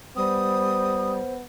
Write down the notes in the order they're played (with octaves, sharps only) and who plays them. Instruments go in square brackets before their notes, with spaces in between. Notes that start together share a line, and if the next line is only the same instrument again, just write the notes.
[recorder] G3 [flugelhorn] B3 [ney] C5 [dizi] D#6